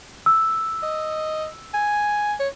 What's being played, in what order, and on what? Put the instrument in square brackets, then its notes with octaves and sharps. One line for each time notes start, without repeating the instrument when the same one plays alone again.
[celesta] E6
[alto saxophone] D#5
G#5
C#5